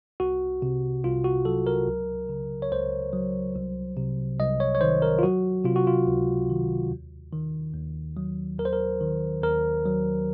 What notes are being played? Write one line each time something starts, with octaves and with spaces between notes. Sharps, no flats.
C2 F#4
C3
C2 F4
F#4
F#3 A4
A#4
C#2
C#3
C#5
C#2 C5
F#3
C2
C3
C2 D#5
C#5
C#5
D#3 C5
A#4
F4
F#3 F#4
C3 F4
F#4
F4
C#2
D#3
D#2
D#3
D#2
F#3
D#2 A#4
C5
A#4
D#3
D#2 A#4
F#3